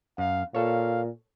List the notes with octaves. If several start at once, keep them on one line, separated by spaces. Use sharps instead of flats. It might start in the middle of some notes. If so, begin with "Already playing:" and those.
F#2 F5
A#2 A4 C#5 F5